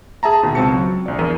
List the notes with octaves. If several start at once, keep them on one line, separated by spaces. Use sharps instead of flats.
G#4 E5 A5 A#5
D#2 B2
C#2 C4 A5 C#7
F#3
A#1 D5
E2 A#4 D#7